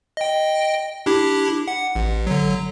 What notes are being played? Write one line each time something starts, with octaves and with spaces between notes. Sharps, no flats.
D#5 G5
D4 E4 G4
F#5
A1
D3 F#3